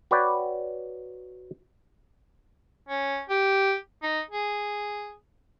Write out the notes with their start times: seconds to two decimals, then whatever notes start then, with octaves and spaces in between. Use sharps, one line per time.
0.11 F#4 B4 C#5 D5 G5
2.89 C#4
3.30 G4
4.03 D#4
4.31 G#4